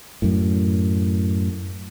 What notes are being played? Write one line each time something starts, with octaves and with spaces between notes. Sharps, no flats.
F#2 A2